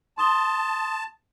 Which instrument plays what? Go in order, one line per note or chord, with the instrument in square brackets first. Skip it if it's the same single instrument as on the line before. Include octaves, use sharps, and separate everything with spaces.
[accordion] A5 [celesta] C6 D#6 G7